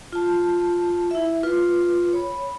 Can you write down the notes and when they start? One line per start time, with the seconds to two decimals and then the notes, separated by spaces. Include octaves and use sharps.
0.13 F4 A5
1.11 E4 E5
1.43 F4 B4
2.13 C#5 B5